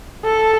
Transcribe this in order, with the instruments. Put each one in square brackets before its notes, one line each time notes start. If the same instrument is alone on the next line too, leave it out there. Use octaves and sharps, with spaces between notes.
[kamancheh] A4